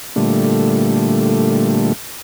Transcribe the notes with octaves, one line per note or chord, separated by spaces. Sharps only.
A#2 D3 G3 A3